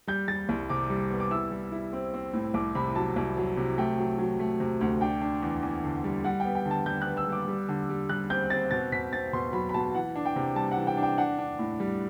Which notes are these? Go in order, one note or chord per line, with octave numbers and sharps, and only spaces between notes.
G3 G6
G3 A6
C2
C3 D6
G3
B3
D6
E4 E6
G3
E4
C4
C4
A2
C2 D6
C3 B5
F#3 A5
C2
F#3
C3
A3 G5
F#3
F#3
A3
C3
D2
D4 G5
D4
E2
E2
D3
G3
G3 F#5
G5
B3
G5
D3
A5
G3 G6
F#6
B3
E6
G3 D6
G3
D3
G3
G3 F#6
C4 G6
C4 A6
B2 A6
B2 B6
C4 A6
B2 C6
F#3 B5
B5
B2 A5
E3 F#5
D4
G5
C3
G3 A5
F#5
E3
G5
D4
G5
D4 F#5
D4
A2
G3